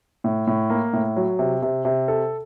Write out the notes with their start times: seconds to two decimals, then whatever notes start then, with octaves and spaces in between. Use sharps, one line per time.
0.24 A2
0.47 A2
0.70 A#3
0.93 A2
1.16 F#3
1.39 C3
1.62 C3
1.85 C3
2.08 A4